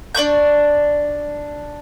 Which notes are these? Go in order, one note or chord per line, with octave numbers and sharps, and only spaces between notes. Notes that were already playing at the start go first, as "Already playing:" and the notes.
D4 D5 C#6 G6